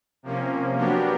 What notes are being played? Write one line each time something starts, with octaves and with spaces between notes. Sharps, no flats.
C3 F3 A#3 C#4
F#3 B3 D4 G4 A#4